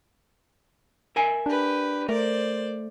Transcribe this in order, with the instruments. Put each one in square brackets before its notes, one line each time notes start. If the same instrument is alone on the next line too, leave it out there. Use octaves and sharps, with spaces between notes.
[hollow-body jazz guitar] A#4 E5 G#5
[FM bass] D4 [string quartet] G4 B4
[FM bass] A3 [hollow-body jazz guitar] A#4 [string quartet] C5 D5